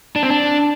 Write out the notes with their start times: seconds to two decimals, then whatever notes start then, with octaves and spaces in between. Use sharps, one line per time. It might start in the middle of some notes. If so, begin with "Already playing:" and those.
0.16 D4
0.23 C4
0.30 D4